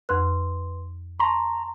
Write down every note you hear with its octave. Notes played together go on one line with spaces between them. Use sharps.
F2 B4 C6 F#6
A5 A#5 C6 C#6